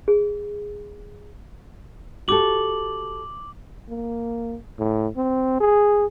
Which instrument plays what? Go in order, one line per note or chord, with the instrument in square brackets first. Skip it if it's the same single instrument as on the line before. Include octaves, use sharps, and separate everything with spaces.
[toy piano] G#4
[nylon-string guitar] F#4 G4 A4 [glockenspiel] D6 F#7
[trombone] A#3
A2
C4
G#4